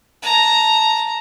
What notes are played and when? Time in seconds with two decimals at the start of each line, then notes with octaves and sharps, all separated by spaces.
0.23 A5 A#5